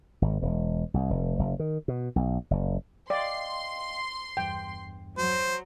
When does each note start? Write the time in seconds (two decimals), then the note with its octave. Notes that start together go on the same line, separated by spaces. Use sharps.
0.22 G#1
0.42 E1
0.94 C2
1.10 F1
1.39 F#1
1.59 D#3
1.88 B2
2.16 B1
2.51 F#1
3.10 D5 D#5 F5 G5 C6
4.37 E2 G2 G5
5.18 F#3 C5